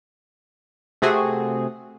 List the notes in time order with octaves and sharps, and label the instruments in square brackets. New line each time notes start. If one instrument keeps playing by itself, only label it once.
[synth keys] C3 A3 C4 F#4 G#4